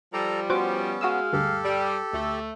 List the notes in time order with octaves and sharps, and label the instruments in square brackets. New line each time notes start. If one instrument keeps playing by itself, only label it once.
[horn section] F3 G3 [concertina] A4 A#5
[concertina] B3 C#4 [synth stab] F#4 C5 D6
[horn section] G#3 F5 [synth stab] F#4 D#6 E6
[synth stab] D2 G2 [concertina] G4 A4
[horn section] G3
[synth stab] D2 [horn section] A3